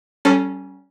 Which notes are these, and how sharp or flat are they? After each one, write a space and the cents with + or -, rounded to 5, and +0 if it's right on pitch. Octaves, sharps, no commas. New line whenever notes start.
G3 -35 C#4 +0 A4 +0